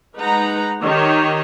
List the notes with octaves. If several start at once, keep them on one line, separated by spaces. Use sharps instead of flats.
G#3 D#4 B4 F#5 A#5
D#3 G4 C#5 D#5